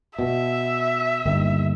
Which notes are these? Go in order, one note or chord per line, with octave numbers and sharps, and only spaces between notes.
B2 E5
G1 D#2 D#3